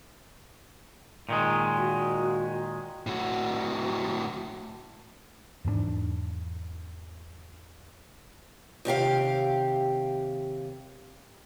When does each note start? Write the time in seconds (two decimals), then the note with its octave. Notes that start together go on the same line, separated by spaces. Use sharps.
1.29 A#2 D#3 G#3
1.78 F#4
3.07 A2 F#4
5.64 E2 G#2 G3 D4
8.85 D#2 C3 G4 F5